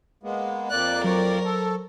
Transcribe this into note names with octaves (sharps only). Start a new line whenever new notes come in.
G#3 A#3 B3
F2 A#3 D5 F#6
F#3 A#4 C5 C#6
A4